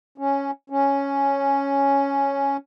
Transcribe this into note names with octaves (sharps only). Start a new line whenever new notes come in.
C#4
C#4